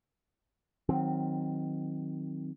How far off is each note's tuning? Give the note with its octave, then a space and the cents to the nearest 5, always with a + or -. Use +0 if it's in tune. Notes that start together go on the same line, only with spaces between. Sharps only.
D#3 +0 F#3 -10 C4 +0